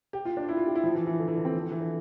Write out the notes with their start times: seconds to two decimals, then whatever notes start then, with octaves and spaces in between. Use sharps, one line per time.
0.13 G4
0.25 F4
0.37 D4
0.49 E4
0.57 F4
0.67 G4
0.75 E4
0.84 F3
0.95 E3
1.07 E3
1.19 D3
1.28 E3
1.37 D3
1.45 C4
1.55 F3
1.71 E3
1.81 D3